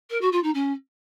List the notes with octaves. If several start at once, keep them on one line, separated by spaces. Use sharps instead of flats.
A#4
F#4
F4
D#4
C#4